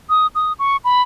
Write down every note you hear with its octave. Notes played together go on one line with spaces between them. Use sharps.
D#6
D#6
C#6
B5